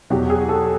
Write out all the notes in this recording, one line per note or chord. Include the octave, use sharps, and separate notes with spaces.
E2 B2 F#3 G4
G#4
A4